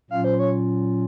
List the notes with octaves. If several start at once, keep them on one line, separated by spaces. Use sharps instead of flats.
A#2 F#3 C#4 F4 F5
C5
C#5